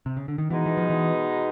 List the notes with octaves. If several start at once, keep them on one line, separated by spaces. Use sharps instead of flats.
C3
C#3
D3
D#3
B2 E3 G#3 B3 D#4
E3
F3
E3